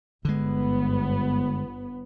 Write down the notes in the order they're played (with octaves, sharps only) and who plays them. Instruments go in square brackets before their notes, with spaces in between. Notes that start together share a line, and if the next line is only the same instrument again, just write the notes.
[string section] G1 B3 [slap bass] D3 G#3